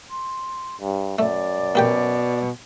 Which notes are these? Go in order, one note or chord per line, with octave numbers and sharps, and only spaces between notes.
C6
G2
F#2 A3 D5
B2 A#3 G4 G5